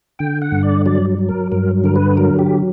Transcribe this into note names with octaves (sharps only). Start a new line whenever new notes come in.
D3 G5
F#5
G2
D5
F#3 D5
F#3
A#4
G2 A#4
D3 A#4
B4
F#3 A#4
G4